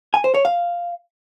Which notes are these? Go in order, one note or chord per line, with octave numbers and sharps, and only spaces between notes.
G#5
C5
C#5
F5